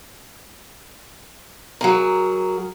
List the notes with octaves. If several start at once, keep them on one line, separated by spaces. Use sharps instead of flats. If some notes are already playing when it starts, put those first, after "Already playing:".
F#3 G#4 A#4